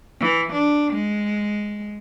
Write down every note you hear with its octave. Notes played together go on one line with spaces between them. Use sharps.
E3
D4
G#3